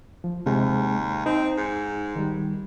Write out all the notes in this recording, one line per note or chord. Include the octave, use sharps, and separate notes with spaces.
F3
D#2 C3 G#3
C4 D#4
G#2
D#3 G3